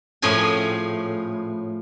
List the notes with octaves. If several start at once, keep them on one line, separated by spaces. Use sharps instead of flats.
A2 F3 C#4 G#4 G#5